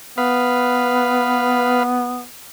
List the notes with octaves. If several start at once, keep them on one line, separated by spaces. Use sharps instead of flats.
B3 B4 F5